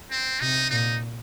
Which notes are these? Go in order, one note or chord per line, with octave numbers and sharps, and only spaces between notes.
C4
C3 D#4
A#2 D#4